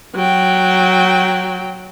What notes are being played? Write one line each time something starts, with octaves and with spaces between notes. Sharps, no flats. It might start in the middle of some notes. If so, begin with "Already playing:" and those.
F#3 G5